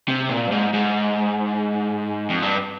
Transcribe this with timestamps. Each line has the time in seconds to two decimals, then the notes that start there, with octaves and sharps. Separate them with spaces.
0.08 C3
0.29 A#2
0.48 G2
0.52 G#2
0.74 G#2
2.30 F2
2.42 G2